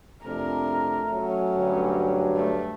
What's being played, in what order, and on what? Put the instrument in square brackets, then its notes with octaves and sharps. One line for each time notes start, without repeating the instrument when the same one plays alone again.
[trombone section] F2 C3 D4 [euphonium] A3 [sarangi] A#4
[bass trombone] F#3 [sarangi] C#4
[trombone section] D2 G2
[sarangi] A3